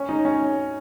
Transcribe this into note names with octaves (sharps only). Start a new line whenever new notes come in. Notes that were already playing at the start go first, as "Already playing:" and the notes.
Already playing: C#4
D#4
C#4